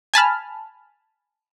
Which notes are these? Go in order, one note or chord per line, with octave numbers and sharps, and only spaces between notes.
G#5 A5 B5 F6